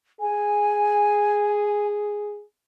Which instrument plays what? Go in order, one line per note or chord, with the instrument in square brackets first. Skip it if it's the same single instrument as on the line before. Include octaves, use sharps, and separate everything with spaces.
[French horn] G#4 [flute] G#5